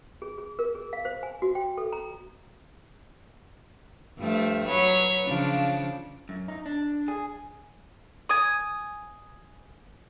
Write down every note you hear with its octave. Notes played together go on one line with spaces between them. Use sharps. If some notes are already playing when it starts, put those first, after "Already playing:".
G#4
G#4
A#4
G#4
F5
C5
G#5
F#4
G5
A4
A#5
G2 F3 A3
F#3 B4 C#5
C#3 F3 D4
F#2
D#4
D4
G#4
G#5 D#6